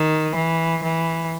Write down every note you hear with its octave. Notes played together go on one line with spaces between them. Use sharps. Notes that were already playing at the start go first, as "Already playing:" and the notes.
Already playing: D#3
E3
E3